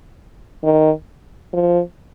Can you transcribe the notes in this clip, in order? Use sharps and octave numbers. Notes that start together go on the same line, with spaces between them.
D#3
F3